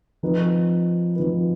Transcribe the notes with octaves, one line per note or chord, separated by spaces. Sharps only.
F3 C4 D#4 B4
F3 C4 D#4 B4